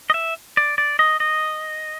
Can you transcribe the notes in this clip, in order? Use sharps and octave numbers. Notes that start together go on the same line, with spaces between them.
D#5
E5
D5
D5
D#5
D#5